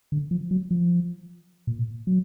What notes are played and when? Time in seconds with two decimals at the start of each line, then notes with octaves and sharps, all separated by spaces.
0.12 D3
0.31 F3
0.51 F#3
0.71 F3
1.67 A#2
2.07 F#3